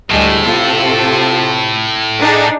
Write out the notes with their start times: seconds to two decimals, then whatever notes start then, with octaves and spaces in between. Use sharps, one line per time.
0.10 D2 A2 G3 G#3
0.43 C3 F4 A4
2.20 D4 D#4 G#4